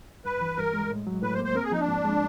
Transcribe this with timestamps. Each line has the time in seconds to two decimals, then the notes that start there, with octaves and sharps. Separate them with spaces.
0.25 G2 B4
0.41 E3
0.57 G2 A#4
0.74 G#3
0.90 A2
1.07 F#3
1.23 A2 B4
1.34 C5
1.39 A#3
1.45 C5
1.55 C4 A#4
1.64 G#4
1.72 F3 D#4
1.80 D4
1.88 G#2
2.04 G#3